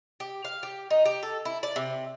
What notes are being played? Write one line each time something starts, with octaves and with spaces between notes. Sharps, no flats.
G4
F5
G4
D#4
G4
A4
E4
D5
C3